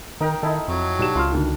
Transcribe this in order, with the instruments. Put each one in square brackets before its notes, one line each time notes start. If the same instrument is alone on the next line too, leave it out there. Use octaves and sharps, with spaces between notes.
[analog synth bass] D#3 [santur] D#4 A#4 G5
[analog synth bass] D#3 [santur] D#4 E4 A4
[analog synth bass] F2 [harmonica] F#3
[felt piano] B1 G4 E7 [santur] D4
[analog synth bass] C#2 [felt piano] F4 C6 F6
[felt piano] D2 D#3